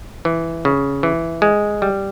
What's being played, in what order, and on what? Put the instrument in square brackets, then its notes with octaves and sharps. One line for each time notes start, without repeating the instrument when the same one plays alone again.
[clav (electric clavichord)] E3
C#3
E3
G#3
G3